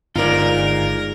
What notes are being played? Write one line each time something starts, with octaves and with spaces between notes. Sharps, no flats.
G1 G#3 D#4 F4 A#4 D5